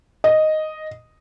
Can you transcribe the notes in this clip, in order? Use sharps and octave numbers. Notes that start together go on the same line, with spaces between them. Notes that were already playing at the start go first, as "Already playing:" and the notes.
D#5